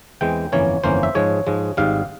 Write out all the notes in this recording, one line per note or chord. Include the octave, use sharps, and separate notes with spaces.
E2 E3 G#3 C4 G5
G1 F2 E3 A#3 C#4 C#5
G1 F2 E3 A#3 C#4 C5
E5
G#2 F3 G#3 C#5
G#2 F3 G#3
G#1 G#2 G3 F5